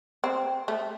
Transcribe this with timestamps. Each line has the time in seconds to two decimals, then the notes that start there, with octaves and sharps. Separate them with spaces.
0.24 C4
0.68 A3